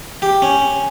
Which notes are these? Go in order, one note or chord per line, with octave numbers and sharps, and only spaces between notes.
G4
C#4